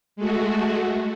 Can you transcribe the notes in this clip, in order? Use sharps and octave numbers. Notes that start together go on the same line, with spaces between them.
G#3 A3 F#4